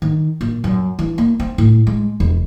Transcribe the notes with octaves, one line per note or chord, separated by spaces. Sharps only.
D#3
A#2
F#2
E3
A#3
C4
A2
G#3
E1